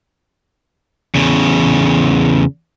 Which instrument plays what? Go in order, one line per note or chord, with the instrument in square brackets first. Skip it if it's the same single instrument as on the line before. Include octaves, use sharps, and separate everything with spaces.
[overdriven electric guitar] E2 C#3